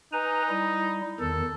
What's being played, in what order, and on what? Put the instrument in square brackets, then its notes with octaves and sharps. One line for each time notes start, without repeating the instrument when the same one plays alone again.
[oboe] D#4 [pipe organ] B4 G#5 A#5
[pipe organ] G3 E4
[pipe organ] E2 D#3 [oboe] A4